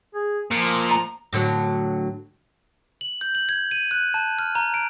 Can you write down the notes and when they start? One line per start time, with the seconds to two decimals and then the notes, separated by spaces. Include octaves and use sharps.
0.15 G#4
0.51 A#2 F3
0.91 A#5
1.33 A2 D3 F#3
3.01 F#7
3.21 G6
3.35 F#7
3.49 G#6
3.71 D#7
3.91 F#6
4.14 A5
4.39 F6
4.55 A#5
4.74 D7